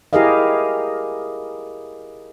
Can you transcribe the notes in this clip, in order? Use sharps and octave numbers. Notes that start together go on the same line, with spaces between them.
E4 G4 G#4 A#4 D#5 F5